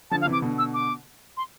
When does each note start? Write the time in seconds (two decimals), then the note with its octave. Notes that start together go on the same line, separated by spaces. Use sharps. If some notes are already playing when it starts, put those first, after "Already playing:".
0.11 D3 F3 A5
0.21 F5
0.26 C3 E3
0.32 D6
0.42 B2 D3
0.58 E6
0.74 D6
1.37 C6